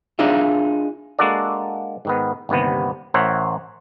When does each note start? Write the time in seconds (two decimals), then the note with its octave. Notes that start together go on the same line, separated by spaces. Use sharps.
0.19 D4 D#4 F4 G#4 E5
1.19 G#3 A#3 D4 F#4 A4 D5
2.05 G#2 D#3 B3
2.49 G1 D#2 C3 B3
3.14 A1 A#4 C5 C#5 E5 F#5